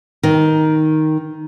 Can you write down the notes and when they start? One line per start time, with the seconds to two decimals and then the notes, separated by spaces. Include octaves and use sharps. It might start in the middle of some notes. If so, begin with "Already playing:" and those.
0.23 D#3